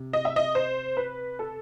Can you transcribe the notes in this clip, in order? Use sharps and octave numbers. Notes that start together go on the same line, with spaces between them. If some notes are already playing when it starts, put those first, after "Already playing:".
Already playing: C3
D#5
E5
D#5
C5
B4
A4